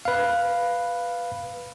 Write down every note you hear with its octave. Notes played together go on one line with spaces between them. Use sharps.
B4 F5